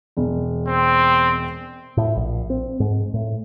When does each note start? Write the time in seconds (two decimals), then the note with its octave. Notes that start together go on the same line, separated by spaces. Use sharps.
0.17 E1
0.68 C4
1.97 A2
2.17 A#1
2.50 C4
2.80 G#2
3.14 A2